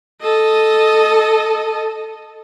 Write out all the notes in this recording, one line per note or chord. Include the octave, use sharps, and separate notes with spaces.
A4 D#5